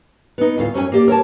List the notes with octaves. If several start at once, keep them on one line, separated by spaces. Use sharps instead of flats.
B3 D#4
D2 A2 F4 F5
F#2 C#4 A#4 C#5 G#5
A#3 G4 D5
A#4 C#5 F#5 A5